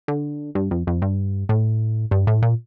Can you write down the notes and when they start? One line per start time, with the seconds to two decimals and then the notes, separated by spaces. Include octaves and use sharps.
0.08 D3
0.55 G2
0.71 F2
0.87 F2
1.02 G2
1.49 A2
2.11 G2
2.27 A2
2.42 A#2